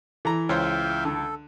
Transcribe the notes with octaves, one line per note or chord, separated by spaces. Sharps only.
E3 A4 A#5
C#2 C5 C#5 E5 F5 G5
D3 A4